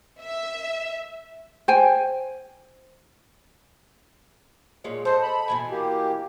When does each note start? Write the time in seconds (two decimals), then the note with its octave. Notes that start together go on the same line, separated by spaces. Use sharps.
0.22 E5
1.68 C5 G5 G#5
4.84 A#2 G#3 C#5
5.05 A4 C5 D#5
5.22 B5
5.48 B2 E3 G#5
5.71 A#3 G4